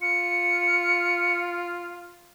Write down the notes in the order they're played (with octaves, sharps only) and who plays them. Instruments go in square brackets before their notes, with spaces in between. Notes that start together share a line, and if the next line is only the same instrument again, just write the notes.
[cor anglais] F4 [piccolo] C#7